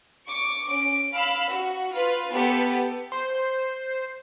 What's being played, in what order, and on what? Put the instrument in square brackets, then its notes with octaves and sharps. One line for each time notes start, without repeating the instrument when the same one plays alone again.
[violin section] C#6 D6 C#7
C#4 D7
F5 B5 E6
F#4
F4 B4
B3 G4 A4 B4
[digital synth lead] C5